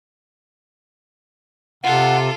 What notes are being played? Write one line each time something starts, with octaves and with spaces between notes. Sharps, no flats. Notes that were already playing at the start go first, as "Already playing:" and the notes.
C3 F4 A4 F#5